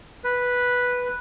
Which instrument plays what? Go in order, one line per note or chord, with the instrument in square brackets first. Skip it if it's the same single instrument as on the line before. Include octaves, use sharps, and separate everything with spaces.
[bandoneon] B4